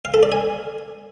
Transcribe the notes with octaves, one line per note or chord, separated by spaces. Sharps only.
F5
A4
D5
G#5